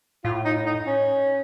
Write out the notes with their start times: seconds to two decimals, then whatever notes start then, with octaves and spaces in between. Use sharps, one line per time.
0.25 A2 F4
0.45 D#4
0.66 D#4
0.87 C#4